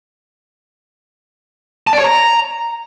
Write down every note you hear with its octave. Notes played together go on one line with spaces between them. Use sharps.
A5
D5
C#5
A#5